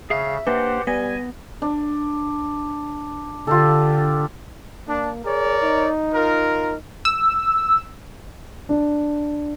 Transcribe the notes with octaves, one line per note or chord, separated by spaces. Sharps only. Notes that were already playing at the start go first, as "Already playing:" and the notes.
C#3 G#4 E5 F5
A#3 D4 G4 B4 C5 F#5
G3 B3 B4 G#5 A#6
D4
D3 F4 G4 A4
A#3 D4
G#4 A#4 C#5 D5
D#4
F4 A#4
E6
D4